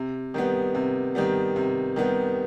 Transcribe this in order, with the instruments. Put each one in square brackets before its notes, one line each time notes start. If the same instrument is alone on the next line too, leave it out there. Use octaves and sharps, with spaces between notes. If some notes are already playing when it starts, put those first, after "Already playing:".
Already playing: [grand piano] C3
D#3 G3 B3
C3
D#3 G3 B3
C3
D#3 G3 B3